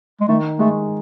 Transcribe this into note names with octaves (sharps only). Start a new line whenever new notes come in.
G#3
D#3 A3
G#3 A3